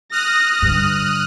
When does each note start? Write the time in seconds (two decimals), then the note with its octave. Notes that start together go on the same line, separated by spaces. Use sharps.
0.11 D#6 F6 F#6 A#6
0.62 G2 D3